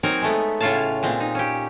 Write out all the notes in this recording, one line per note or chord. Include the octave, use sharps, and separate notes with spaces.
F#3 C4 D#4 A#4 G#5
G#3 A3 B3
A2 C#3 F4 C#5 F5 A5
A#2 G#3 C4
D#4
C#4 G4